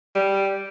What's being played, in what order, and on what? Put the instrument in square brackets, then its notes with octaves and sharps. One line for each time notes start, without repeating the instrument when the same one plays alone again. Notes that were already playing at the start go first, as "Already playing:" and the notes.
[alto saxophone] G3